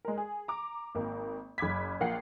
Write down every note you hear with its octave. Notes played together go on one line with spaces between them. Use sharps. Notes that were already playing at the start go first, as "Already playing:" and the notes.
G#3 A#4
G#4
A#5 D6
G#1 A#3
F#1 B5 D6 G#6 B6
A#1 A#3 F4 F#5 G5 C7